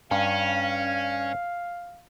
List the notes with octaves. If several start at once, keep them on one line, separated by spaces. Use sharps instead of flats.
G2 C#4 F5